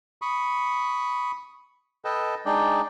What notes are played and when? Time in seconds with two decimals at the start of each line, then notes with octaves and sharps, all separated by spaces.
0.22 B5 C#6 D#6
2.05 A4 B4 D#5 G5 A5
2.46 G#3 D4 D#4 D5 G5